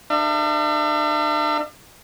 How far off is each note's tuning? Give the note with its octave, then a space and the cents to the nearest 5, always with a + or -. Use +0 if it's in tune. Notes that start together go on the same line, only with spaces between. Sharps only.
D4 +45 E5 +40